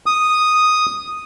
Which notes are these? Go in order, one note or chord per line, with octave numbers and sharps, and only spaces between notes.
D#6